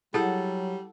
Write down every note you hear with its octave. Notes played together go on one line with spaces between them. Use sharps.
F#3 G3 E4 G#4 A4 F#5